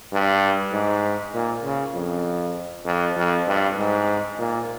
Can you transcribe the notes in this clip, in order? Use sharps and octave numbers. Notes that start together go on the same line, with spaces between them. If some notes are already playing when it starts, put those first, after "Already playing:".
G2
G#2
A#2
C#3
F2
F2
F2
G2
G#2
A#2